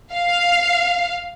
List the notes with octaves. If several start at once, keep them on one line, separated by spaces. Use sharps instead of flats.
F5